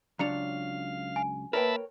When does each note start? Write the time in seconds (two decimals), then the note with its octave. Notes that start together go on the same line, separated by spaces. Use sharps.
0.19 C#2 F#3 D4 F5 A#5 C#7 F7
1.16 G#5
1.53 A#3 A#4 B4 C#5 E5 G5 A5 B5